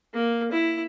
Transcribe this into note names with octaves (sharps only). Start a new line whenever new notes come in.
A#3
E4